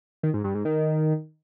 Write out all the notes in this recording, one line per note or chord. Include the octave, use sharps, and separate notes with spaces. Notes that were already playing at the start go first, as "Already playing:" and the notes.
D#3
G#2
G2
G#2
D#3